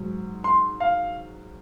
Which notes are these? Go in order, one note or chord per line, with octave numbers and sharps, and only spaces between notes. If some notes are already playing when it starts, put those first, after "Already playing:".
Already playing: G#2 F#3
C6
F5